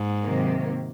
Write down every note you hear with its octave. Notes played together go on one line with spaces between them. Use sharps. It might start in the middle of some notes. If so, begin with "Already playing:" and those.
Already playing: G#2
C3 D#3 F#3 A#3